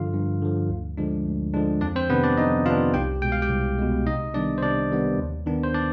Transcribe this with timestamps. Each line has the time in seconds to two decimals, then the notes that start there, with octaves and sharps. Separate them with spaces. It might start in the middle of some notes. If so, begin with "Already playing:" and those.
Already playing: G2 D3 F3 F4 F5
0.13 G2
0.42 D3 F3
0.70 D2
0.97 D3 F3 G#3 D4
1.25 D2
1.54 D3 F3 G#3 D4
1.81 F2 D4 D5
1.96 C4 C5
2.10 C3 D#3 B3 D4 B4
2.24 D4 D5
2.38 F2 D#4 D#5
2.66 C3 D#3 B3 D4 F4 F5
2.94 C2 G4 G5
3.22 B2 G#3 G5
3.32 F5
3.42 G4 G5
3.50 C2
3.78 B2 G#3
4.06 C3 D#4 D#5
4.34 D#3 G3 B3 D4 D5
4.58 C5
4.63 C3 D4 D5
4.91 D#3 G3 B3
5.19 D#2
5.46 D#3 B3 D4
5.64 C5
5.74 D4 D5